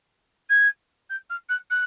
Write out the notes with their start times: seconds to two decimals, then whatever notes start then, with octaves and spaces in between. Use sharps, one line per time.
0.50 G#6
1.10 G6
1.30 F6
1.49 F#6
1.71 F#6